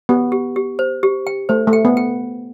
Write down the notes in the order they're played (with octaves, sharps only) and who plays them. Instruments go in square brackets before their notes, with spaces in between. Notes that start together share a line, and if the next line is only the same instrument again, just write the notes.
[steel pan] B3 [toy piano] G4
[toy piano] G4
G4
C5
G4
G5
[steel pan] A3 [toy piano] C5
[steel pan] A3
[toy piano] G5
[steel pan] B3
[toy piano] G5